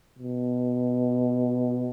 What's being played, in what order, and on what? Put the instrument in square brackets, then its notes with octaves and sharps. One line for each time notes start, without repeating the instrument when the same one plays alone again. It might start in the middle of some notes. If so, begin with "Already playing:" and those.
[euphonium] B2